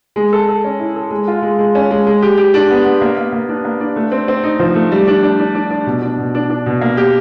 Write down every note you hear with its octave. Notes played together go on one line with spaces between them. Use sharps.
G#3
A4
A4
C#4
E4
A4
G#3
F4
G#3
G#3
C#4
G#3
G#3
G4
G4
D4
B3
B3
A#3
A#3
A#3
D4
A#3
D4
A3
C4
C4
D#4
F3
A3
G3
D4
D4
D4
D4
D4
B2
D4
B2
D4
D4
B2
A#3
G4